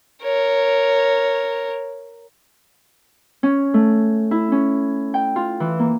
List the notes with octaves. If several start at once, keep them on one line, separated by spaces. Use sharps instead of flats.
A#4 C#5
C#4
A3
E4
C#4
G5
F4
E3
A#3